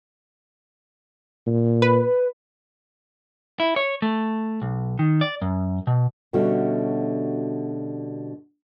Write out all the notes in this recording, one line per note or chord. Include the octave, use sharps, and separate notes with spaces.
A#2
B4
E4
C#5
A3
B1
D#3
D5
F#2
B2
B2 D3 G3 A3 C#4 F#4